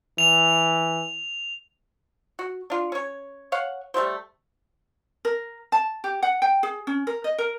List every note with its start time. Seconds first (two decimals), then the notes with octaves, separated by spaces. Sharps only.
0.18 E3 F7
2.39 F#4
2.70 D4 F4
2.92 C#4 C#5
3.52 C#5 F5 F#5
3.94 G3 A3 E4 C5
5.25 A#4
5.72 A5
6.04 G4
6.23 F#5
6.42 G5
6.63 G#4
6.87 C#4
7.07 A#4
7.24 D#5
7.38 A#4